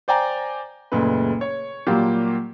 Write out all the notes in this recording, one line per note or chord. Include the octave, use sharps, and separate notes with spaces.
C5 D5 G5 G#5 A#5
F#1 A#2 C#3 G#3 A3 B4
C#5
A#2 F#3 G3 A#3 F4 G4